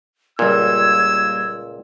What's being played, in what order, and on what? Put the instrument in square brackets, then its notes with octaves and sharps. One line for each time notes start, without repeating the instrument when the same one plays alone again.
[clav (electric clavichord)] C#2 A#2 [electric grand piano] G3 A#3 [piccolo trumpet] E6 [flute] G#6